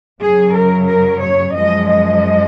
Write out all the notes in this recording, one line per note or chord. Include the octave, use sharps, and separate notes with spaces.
F#2 C#3 F#3 G#4
A#4
A#4
C#5
F#2 F3 G#3 D#5
D#5